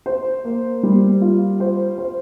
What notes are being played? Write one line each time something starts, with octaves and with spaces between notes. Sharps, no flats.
C5
A#3
G3
F4
C5
C5